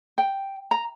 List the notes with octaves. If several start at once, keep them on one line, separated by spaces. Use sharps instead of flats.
G5
A#5